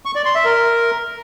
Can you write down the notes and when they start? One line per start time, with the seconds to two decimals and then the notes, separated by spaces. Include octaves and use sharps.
0.05 C#6
0.15 D5
0.25 C6
0.35 E5
0.45 A#4